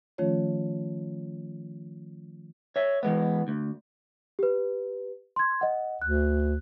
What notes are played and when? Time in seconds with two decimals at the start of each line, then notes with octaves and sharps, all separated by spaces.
0.18 D#3 F3 A3 C#4 F4 C#5
2.76 C#5 E5
3.03 E3 G#3 B3
3.48 D2
4.39 G4 B4
5.36 C6 G#6
5.61 D#5 F#5
6.02 D2 F#6